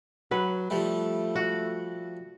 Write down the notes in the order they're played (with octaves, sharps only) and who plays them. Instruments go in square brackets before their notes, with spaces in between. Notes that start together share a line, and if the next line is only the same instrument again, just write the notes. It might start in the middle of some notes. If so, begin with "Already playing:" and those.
[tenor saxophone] F#3 [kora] B4
[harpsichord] F3 G3 [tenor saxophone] A3
[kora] F#4